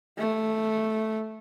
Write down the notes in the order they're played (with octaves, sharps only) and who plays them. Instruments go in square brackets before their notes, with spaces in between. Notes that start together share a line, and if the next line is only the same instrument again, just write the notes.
[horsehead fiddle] A3